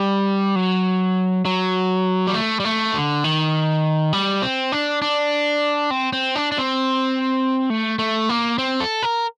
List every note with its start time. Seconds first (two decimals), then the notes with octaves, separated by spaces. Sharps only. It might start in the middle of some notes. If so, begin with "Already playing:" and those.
Already playing: G3
0.56 F#3
1.45 F#3
2.27 G3
2.34 A3
2.60 G3
2.65 A3
2.94 D3
3.24 D#3
4.13 G3
4.42 C4
4.72 D4
5.02 D4
5.91 C4
6.13 C4
6.35 D4
6.52 D4
6.58 C4
7.70 A3
7.99 A3
8.29 A#3
8.58 C4
8.80 A4
9.03 A#4